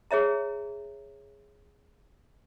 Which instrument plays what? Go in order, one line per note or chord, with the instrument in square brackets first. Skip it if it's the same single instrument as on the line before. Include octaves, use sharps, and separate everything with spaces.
[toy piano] G#4 C#5 E5 A#5